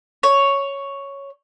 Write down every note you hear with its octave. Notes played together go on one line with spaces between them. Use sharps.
C#5